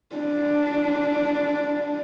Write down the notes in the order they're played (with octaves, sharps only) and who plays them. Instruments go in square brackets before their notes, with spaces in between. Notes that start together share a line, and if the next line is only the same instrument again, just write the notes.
[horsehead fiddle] D4